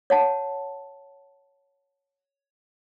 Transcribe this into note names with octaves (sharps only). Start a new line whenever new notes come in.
C#5 F#5 A5